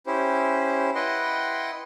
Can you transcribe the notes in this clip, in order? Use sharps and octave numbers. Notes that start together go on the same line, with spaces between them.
C#4 E4 G4 C5
E4 B4 D#5 F#5 G5 C6